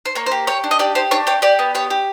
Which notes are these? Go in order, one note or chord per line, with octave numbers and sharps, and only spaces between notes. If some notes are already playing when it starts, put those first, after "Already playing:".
C5
A#3 C#5
C5
G4
G4 C#5
D4
D#5
G4 D5
G4 C5
D4 C#5
G4 C#5
G4 D5
B3
G4 C#5
G4